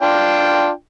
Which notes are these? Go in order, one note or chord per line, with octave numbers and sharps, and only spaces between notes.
D4 F4 G5